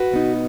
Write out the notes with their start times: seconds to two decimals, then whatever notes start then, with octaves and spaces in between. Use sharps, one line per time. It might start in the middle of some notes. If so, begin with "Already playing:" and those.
Already playing: F#4 B4
0.12 B2 B3 D#4